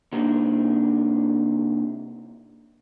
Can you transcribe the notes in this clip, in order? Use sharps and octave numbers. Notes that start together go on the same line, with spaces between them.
C3 A#3 D4 D#4